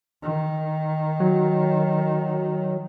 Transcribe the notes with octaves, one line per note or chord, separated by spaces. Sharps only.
D#3
F#3